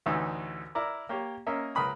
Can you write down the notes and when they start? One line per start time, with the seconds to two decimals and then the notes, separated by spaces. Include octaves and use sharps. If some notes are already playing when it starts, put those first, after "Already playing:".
0.06 A1 D2 E3 D#4
0.75 E4 A#4 D5 A#5
1.09 A#3 G4 C#5
1.46 A#3 C#4 A#4 D#5 E5
1.75 C#2 A#4 B4 B5 D#6